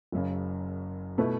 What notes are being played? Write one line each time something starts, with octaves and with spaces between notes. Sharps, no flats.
F#1 F#2 C#3
B2 A3 E4 B4